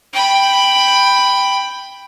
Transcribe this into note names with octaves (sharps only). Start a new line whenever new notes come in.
G5 B5